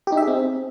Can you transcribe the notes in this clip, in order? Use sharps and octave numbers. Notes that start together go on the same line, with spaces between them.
G4
D#4
E5
G#4
C4